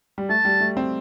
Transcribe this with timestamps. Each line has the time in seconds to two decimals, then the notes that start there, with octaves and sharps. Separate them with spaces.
0.18 G3
0.29 A3 A5
0.45 G3
0.61 A3
0.77 C4